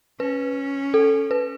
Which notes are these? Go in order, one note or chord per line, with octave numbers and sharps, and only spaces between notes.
C#4 B4
A4
B4